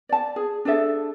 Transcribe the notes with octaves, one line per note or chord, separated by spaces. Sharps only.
D5 A5
G#4
D4 G#4 A4 E5